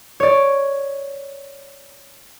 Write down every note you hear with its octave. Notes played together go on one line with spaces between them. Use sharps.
C#5 D5